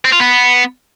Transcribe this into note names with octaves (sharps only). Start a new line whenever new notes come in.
C4
F4
B3